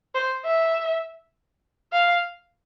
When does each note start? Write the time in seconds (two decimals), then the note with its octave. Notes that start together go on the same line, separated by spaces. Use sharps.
0.15 C5
0.45 E5
1.93 F5